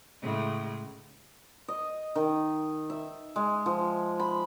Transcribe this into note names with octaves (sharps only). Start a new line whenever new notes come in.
A2 C#3 G#3
D#5
D#3
E5
G#3
F3
B5